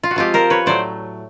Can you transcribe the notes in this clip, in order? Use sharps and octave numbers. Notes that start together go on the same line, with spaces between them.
F4
F#4
F3 G#3 C4 F4 G4
A#4 C5
B4 C#5
A2 F#3 A3 C5 D5